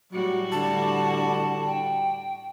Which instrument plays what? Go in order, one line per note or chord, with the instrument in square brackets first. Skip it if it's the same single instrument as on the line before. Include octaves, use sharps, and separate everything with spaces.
[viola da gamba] A2 G3 F#4 [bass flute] F#3
[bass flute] D3 [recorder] A5
[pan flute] G5